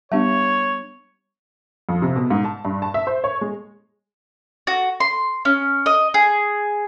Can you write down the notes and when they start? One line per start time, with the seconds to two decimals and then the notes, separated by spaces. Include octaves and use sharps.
0.12 G3 B3 D4 G4 C#5 E5
1.89 F2
2.02 C3
2.16 B2
2.30 G#2
2.44 A5
2.65 G2
2.82 A5
2.94 E5
3.07 C5
3.24 C#5
3.41 G#3
4.67 F#4
5.00 C6
5.45 C#4
5.86 D#5
6.14 G#4